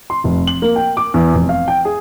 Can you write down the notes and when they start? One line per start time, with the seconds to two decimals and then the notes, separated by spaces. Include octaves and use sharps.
0.10 C6
0.24 F1
0.47 F#7
0.62 A#3
0.76 G5
0.97 D6
1.14 E2
1.34 F1
1.49 F5
1.68 G5
1.85 G#4